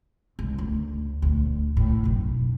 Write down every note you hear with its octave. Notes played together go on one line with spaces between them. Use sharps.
C#2
D2
D2 A#2
A2
B1 F#2